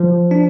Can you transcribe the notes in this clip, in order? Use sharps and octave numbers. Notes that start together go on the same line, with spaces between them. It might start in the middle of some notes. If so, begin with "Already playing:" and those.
Already playing: F3
D4